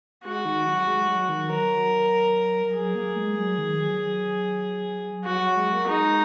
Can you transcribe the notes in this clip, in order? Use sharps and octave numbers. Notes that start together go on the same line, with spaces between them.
G#3 F#4
D#3
F#3
G#3
F#3
D#3
F#3 A#4
F#3 G#4
A#3
G#3
F#3
D#3
F#3
F#3 F#4
F#3
G#3
A#3
G#3 D#4